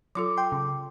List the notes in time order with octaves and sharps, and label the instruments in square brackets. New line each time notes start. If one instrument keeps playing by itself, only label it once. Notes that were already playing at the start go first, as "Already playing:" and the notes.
[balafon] F#3 F4 A4 [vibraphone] D6
[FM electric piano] G5 C6
C#3